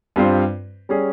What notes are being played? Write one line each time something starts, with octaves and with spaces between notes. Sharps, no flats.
G2 G3 C4 F4 C5
G3 C#4 G#4